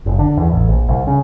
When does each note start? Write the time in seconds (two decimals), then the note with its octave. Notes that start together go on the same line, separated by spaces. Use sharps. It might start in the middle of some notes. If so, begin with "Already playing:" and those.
0.06 F#1
0.19 D3
0.37 E2
0.52 A1
0.69 A#1
0.89 C2
1.07 C#3